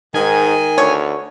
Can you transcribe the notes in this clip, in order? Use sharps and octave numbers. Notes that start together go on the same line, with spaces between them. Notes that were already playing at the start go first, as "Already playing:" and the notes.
G#2 D#3 G#5
D2 C#5